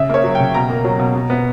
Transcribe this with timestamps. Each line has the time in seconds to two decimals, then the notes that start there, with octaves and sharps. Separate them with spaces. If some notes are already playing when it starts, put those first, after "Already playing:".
Already playing: C#3 E5
0.09 A#3 C#5
0.24 F#3
0.35 C#3 G5
0.54 B2 A#5
0.70 A#3
0.84 F#3
0.99 B2
1.16 B2
1.30 B3